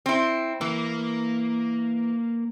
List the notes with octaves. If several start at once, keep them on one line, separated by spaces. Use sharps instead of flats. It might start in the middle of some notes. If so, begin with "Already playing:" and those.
C4 E4
E3 A#3